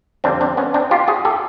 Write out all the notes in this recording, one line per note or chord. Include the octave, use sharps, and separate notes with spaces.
F2 D3 G3 C4 D4
C4 D4
B3 C#4
C4 D4
F4 G4
F#4 G#4
G4 A4